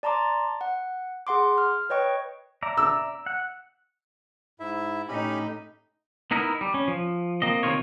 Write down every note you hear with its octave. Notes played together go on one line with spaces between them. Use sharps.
D5 A5 A#5 C6 D6
F#5
G#4 F#5 C6 D6
F6
B4 C#5 D#5 G5 C#6
D5 E5 A#5
E6
F#5
G#2 E4 E5
A2 C#4 D#4 G4 B5
B3 D#4 E4 A#4
G3
C#4
F3
A#3 C4 D#5
C3 D#3 E3 C4 F4 C#5